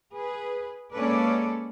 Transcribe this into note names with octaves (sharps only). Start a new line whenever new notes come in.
G#4 B4
G#3 A#3 C#4 A4 B4 D5